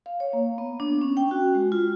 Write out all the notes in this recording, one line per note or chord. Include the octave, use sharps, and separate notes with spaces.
F5
C#5
A#3
B3
D4
C#4
G5
F#4
G#3
F4